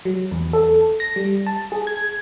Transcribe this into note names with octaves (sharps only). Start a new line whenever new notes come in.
F#3
E2
A4
A#6
G3
A5
G#4
G#6